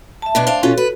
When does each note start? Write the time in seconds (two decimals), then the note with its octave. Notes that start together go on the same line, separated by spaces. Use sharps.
0.22 E5 A5
0.35 B2 B3 D4
0.47 D4 C5 F5
0.63 B2 C#4 F4 F#4 A4
0.77 B4